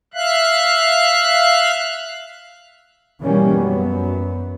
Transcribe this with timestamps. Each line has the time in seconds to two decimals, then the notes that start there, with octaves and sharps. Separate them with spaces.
0.14 E5 F5 F#6
3.22 B2 E3 G3 G#3 A#3 C#4
3.52 F#2 B3